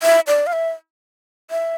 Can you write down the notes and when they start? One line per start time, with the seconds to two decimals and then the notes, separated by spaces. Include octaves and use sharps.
0.03 E5
0.27 D5
0.47 F5
0.53 E5
1.51 E5